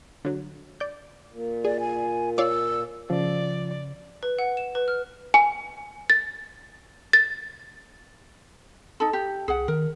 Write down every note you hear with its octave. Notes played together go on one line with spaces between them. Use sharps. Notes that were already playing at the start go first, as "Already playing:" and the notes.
D3 F#3
D5 G6
A#2
G#4 D5
G#5
F4 C#5 D5 E6
C#3 F3 D5
B4
F#5
E7
B4
F6
G#5
A6
A6
D#4 A4
G4
C2 G#4 F#5
D#3 A#4